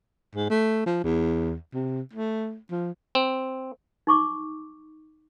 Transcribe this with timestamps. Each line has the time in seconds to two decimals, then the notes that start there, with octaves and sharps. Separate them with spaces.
0.35 G#2
0.50 A3
0.86 F3
1.04 E2
1.74 C3
2.13 A3
2.71 F3
3.15 C4
4.07 D#4 C#6 D6